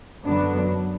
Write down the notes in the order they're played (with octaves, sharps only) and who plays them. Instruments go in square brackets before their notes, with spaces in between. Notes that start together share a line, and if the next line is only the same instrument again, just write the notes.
[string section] F#2 D3 F#3 B3 D4